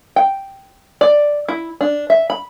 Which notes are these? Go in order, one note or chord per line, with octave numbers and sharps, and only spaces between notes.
G5
D5
E4
D4
E5
B5